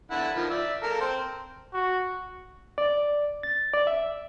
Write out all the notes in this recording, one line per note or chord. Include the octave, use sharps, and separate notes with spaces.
D3 E4 F#5
D#3 F3
D5 E5
A4 A#4 F5
C4 C5
F#4
D5
A6
D5
E5